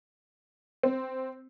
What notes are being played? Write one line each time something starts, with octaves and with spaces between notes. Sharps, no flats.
C4